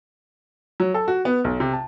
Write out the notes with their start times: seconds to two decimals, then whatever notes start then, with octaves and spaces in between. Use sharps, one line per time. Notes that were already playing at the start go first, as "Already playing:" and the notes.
0.80 F#3
0.94 A4
1.08 F#4
1.25 B3
1.44 B1
1.60 C3
1.73 A5